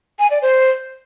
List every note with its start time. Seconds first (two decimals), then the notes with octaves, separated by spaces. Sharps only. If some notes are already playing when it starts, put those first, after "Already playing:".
0.19 G#5
0.31 D5
0.42 C5